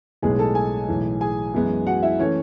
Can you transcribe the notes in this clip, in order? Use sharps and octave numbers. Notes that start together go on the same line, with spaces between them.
B1 A2 G#3 B3 G#4 G#5
A4 A5
G#4 G#5
B1 A2 E3
G#4 G#5
F#2 E3 G#3 B3
F#4 F#5
E4 E5
E3 A3 C#4 C#5